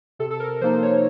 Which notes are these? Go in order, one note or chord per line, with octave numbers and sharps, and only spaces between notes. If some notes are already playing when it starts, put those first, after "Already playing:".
C3 A4
A4
A#4
F3 A#3 D#4 C5
C#5